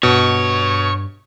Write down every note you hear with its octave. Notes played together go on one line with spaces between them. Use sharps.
G2 B2 C#5